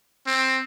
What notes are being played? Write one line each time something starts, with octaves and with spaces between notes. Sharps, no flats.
C4